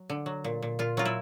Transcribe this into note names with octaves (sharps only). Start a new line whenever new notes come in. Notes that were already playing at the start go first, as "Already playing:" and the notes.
Already playing: F#3
D3
F#3
A#2
A#2
A#2 F4
F#3 F4
E4